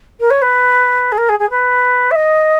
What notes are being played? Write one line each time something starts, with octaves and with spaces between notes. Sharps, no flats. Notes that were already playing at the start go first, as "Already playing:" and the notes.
A#4
C#5
B4
G#4
A#4
G#4
G#4
B4
E5
D#5